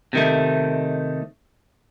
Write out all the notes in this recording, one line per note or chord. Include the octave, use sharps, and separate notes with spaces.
C3 D#3 A3